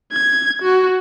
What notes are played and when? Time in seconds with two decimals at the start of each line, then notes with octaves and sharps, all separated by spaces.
0.13 G#6
0.62 F#4